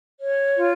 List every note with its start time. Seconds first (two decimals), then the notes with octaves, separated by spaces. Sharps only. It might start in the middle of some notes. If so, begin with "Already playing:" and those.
0.20 C#5
0.57 F4